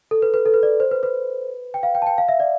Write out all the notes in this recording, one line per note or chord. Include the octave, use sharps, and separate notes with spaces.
A4
B4
B4
A4
B4
D5
C5
B4
B4
G5
F5
G5
A5
G5
F5
E5
D5